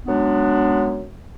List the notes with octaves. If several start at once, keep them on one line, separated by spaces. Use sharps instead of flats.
F#2 G#3 B3 D4